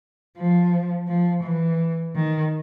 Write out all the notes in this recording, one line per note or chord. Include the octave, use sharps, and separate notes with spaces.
F3
F3
E3
D#3